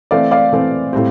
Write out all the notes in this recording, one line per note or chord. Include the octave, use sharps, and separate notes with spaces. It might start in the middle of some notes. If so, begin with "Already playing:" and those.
E3 A3 C4 D5 F5
D5 F5
E3 A3 C4
A2 G3 C4